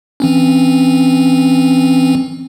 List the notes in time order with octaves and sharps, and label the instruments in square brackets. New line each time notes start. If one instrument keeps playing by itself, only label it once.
[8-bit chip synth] E3 C4 C#4